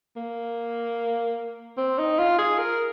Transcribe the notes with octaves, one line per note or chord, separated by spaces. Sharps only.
A#3
C4
D#4
F4
G#4
A#4